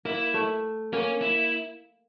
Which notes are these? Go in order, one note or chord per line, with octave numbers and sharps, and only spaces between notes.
A#3 E4
A3
A#3 C#4
E4